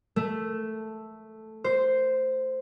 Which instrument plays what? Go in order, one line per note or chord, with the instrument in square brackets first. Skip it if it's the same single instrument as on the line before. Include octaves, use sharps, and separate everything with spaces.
[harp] A3
C5